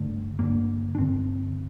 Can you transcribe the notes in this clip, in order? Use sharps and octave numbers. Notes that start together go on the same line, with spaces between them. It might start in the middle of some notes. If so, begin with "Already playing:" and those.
Already playing: G2 D3 A3
G2 D3 A#3
D4
G2 D3 C4